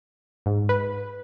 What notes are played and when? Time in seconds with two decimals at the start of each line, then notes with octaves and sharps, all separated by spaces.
0.46 G#2
0.69 B4